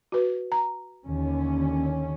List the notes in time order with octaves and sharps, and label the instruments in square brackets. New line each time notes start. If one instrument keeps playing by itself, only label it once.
[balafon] F#4 B4
A#5
[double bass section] D#2 D3 C#4